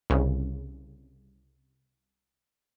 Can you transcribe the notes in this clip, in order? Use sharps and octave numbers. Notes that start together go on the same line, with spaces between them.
C2 C#3